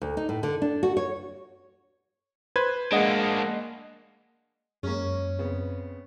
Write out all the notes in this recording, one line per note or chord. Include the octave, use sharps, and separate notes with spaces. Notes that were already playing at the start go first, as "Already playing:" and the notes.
D2
D#4
A2
D3
D4
F#4
C#5
B4 C5 G#6
G#3 A#3 D4 D#5 F#5
F#2 G#3 A#3 C#4
C#3 B3 C4